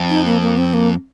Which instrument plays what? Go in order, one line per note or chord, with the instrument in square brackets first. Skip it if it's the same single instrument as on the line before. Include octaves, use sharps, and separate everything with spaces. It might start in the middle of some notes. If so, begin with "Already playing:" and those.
Already playing: [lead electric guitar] F2
[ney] D#4
A#3
A#3
C4
A#3